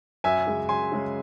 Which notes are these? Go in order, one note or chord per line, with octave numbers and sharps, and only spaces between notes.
F#2 E5 G#5
C#3 G#3
F#2 G#5 C6
C#3 G#3